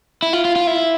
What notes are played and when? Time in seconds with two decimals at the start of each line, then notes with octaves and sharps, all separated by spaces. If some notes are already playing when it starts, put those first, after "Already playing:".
0.22 E4
0.33 F4
0.45 F4
0.56 F4
0.67 E4